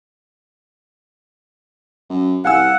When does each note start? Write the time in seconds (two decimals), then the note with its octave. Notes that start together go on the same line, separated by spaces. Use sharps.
2.10 F#2
2.45 C2 F5 F#5 G#5 E6